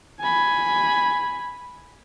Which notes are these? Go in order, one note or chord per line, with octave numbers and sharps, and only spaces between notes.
G#5 B5